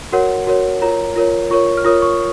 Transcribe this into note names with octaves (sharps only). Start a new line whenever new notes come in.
F#4 A#4 C#5 F#5
F#4 A#4 C#5
F4 A#4 C#5 A#5
F4 A#4 C#5
F4 A#4 C#5 C#6
F6
F4 A#4 C#5 D#6
C#6